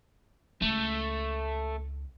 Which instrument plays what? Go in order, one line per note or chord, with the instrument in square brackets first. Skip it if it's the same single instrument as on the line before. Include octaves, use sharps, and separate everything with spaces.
[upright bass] C#2 [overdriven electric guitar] A3